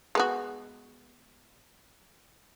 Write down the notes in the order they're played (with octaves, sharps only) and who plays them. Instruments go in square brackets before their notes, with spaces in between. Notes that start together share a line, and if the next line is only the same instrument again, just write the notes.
[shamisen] G#3 B3 F#4